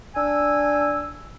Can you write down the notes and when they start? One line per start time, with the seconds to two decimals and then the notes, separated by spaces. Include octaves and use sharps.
0.16 D4 G#5 E6